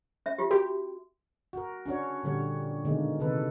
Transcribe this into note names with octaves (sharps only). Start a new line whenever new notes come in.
C#4 E5
F4 G4
F#4 G4
F#4 A#4
C#4 D4 F#4 C#5
A#2 D3 G3 C#5
B2 D3 D#3 G#3 A#3
C3 D#3 A4 B4